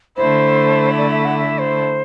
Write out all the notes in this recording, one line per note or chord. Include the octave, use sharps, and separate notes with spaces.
D3 A3 E4 C5
D5
E5
F#5
E5
C5